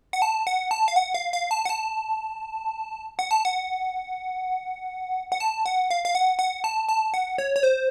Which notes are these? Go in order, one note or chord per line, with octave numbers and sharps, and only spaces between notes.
F#5
A5
F#5
A5
F5
F#5
F5
F5
A5
F#5
A5
F#5
A5
F#5
F#5
A5
F#5
F5
F5
F#5
F#5
A5
A5
F#5
C#5
C#5
C5